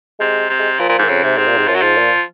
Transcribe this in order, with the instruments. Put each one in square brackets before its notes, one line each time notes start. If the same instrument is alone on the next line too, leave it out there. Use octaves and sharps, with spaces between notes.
[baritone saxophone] C3 [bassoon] G#3
[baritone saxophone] C3
[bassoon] G#3
[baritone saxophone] A#2 [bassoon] F3
[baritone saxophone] A#2
G#2
[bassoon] D#3
[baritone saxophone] F2 [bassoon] C#3
[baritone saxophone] G#2 [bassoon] C3
[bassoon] G#2 [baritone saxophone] C3
[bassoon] A#2
G#2
[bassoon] F#2 [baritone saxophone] F3
[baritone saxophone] F#3
[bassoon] G#2 [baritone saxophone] F3
[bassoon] A#2